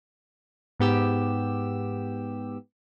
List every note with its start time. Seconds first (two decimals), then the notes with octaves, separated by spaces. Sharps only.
0.80 G#2 B3 G4 E6